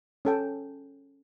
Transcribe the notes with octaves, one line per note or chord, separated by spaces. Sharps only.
C#4 A4 G5